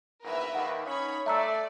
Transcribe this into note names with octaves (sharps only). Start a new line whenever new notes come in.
A#1 E2 G#2 A#4 B4 E5
D#2 F#5
C#4 D#4 C#5 B5
A3 D5 E5 A#5 E6